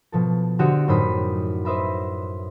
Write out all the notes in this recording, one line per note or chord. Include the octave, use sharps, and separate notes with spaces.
B2 F3 A4
D3 F#4 G4 C5 D#5 C#7
F#2 A2 D#4 C5 B5 D#6
B4 C5 D#5 E5 B5